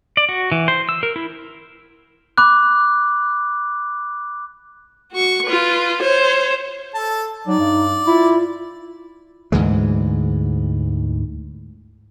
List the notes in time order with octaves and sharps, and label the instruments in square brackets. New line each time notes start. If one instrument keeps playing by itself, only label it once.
[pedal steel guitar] D5
F#4
E3
C5
E6
A#4
E4
[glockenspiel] B5 D6 F#6
[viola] F#4 C#6
F4 B4
C5 C#5
[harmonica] A4 A5
[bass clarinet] F#3 [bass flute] D#4 [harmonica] D5
[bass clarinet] G2
[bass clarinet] E4 [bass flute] F4
[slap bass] D2 G#2 E3 G#3